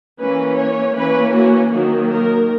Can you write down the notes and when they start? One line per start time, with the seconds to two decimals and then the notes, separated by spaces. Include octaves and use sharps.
0.20 E3 A#3 C#4 B4
0.58 C#5
0.96 E3 A#3 C#4 B4
1.34 F#4
1.72 D#3 F#3 A#3 F#4
2.09 A#4